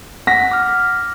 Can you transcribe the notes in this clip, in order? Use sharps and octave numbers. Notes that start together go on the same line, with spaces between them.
F#5 A#6 B6
D6 F6